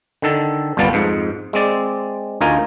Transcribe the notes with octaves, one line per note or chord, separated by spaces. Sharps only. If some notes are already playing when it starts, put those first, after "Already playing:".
D3 D#3 A4
G1 C2 G3 B3 F4 A5
F2 G#2
G#3 C4 D5
D2 D#4 F4 A#4 G#5